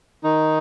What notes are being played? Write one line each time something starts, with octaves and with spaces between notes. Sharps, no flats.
D#3 D#4